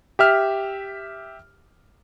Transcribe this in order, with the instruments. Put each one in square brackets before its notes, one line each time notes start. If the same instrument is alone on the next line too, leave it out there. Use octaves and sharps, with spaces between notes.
[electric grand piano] G4 E5 F6